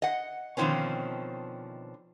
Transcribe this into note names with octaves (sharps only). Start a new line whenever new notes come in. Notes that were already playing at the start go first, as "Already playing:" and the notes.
D#5 F#5
B2 D3 D#3 F3 C4 C#4